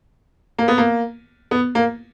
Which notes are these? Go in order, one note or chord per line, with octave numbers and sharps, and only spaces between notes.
A#3
B3
A#3
B3
A#3